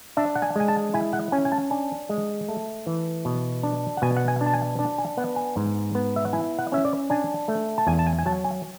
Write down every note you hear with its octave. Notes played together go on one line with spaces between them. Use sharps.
D4 E5
F#5
G#5
G#3 G#5
A5
E4 G#5
F#5
C#4 G#5
G#5
A5
D4 G#5
G#3
A3
E3
B2
D4
F#5
B2 G#5
F#5
G#5
D4
A5
G#5
D4 A5
G#5
B3 F#5
G#5
G#2
B3
E5
F#5
E4 G#5
F#5
C#4 E5
D5
D4 G#5
A3
A5
E2 G#5
A5
G#5
G#5
F#3 A5
G#5